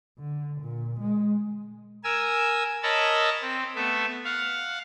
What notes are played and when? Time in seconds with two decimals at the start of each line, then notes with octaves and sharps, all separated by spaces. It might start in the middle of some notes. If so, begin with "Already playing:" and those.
0.19 D3
0.62 A#2
1.00 G#3
2.04 A#4 G#5 E6
2.83 A#4 C#5 D#5 A5 B5 E6
3.41 C4
3.75 A3 B3 E5
4.25 F5 F#5